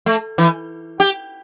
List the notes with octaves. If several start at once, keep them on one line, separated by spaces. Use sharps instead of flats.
A3
E3
G4